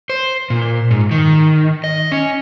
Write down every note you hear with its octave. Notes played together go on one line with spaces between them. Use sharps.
C5
A#2
G#2
D#3
D#5
C#4